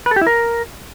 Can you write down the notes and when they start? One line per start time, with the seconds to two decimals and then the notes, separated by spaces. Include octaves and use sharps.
0.06 B4
0.11 A4
0.16 G4
0.21 E4
0.27 A#4